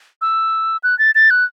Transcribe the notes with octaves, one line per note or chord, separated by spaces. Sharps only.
E6
F#6
A6
A6
F#6